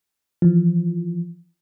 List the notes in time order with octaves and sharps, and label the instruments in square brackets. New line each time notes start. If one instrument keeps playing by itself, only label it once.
[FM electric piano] E3 F3